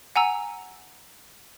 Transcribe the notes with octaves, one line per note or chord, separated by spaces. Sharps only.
F#5 G#5 A#5 E6